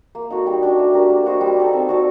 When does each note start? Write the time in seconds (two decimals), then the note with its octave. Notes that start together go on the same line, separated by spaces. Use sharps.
0.15 A#3
0.30 D#4 F#4 A4
0.46 G3
0.63 D4 F#4
0.79 A3
0.94 D4 G4 A#4
1.10 A#3
1.26 F#4 C5 D#5
1.41 G3
1.57 A#3 D#4 A4
1.73 C4
1.89 F#4 A4 D5